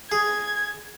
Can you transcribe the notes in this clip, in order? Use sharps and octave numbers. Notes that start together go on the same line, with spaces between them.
G#4 G#6